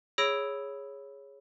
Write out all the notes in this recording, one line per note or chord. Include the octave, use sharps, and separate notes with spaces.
G#4 C#5 B5 E6 A#6 D7